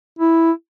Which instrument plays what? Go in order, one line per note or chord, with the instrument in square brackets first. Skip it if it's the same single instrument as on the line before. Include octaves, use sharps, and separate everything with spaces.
[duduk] E4